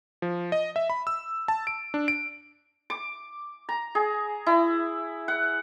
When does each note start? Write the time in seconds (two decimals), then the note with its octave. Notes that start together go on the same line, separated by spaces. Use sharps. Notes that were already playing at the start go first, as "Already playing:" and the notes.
0.22 F3
0.52 D#5
0.76 E5
0.90 B5
1.07 E6
1.48 A5
1.67 D7
1.94 D4
2.08 D7
2.90 D6
3.69 A#5
3.95 G#4
4.46 E4
5.28 F#5